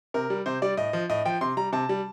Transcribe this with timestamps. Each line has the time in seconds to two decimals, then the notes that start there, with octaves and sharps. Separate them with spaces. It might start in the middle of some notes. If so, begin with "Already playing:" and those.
0.14 C3 A#4
0.30 G3
0.46 C3 C5
0.62 G3 D5
0.77 A2 D#5
0.93 F3
1.09 A2 D#5
1.25 F3 G5
1.41 C3 C6
1.57 G3 A#5
1.73 C3 A5
1.89 G3